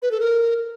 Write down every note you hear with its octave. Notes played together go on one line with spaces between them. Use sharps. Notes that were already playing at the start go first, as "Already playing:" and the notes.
B4
A4
A#4